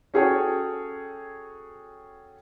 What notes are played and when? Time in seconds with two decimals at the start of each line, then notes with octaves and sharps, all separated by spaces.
0.14 C#4 F#4 G#4 A4 C#5 G5